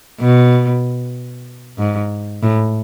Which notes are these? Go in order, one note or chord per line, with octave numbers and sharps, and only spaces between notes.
B2
G#2
A2